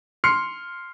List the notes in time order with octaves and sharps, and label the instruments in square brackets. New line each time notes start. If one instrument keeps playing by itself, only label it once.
[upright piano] C6 F6 C7 C#7